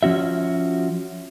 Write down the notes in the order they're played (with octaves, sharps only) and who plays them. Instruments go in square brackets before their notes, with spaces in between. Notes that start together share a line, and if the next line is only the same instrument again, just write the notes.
[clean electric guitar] F3 C#4 F#4 E5